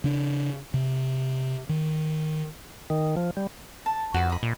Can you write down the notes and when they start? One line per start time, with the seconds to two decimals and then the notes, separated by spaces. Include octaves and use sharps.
0.04 C#3 D4
0.74 C3
1.69 D#3
2.90 D#3
3.17 F3
3.37 G3
3.86 A5
4.14 F2 F#4 B4
4.30 D#5 B5
4.43 A#2